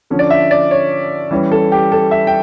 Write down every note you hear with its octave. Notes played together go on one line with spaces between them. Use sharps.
D3 F3 C#4
D5
E5
D5
C#5
E3 G3 C#4
A4
G4
A4
E5
G5